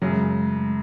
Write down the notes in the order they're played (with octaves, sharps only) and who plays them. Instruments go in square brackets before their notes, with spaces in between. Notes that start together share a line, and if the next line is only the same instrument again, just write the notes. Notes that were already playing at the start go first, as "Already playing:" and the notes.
[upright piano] F#2 C#3 F#3 [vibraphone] G#3
[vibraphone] A3